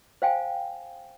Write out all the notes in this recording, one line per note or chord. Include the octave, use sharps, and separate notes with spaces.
C5 F5 G5 G#5